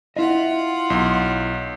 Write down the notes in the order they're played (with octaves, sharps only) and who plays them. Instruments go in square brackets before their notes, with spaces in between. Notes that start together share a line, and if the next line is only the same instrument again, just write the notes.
[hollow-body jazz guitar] E4 D#5 [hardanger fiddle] F4 F#5
[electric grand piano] B1